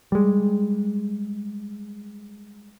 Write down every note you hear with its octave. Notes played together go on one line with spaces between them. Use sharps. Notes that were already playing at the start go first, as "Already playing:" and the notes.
G3 G#3